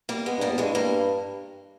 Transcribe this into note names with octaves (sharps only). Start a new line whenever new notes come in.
G3 A#3
G#3 B3
G2 G3 A#3
E2
G2 E3 G#3
G2 G3 A#3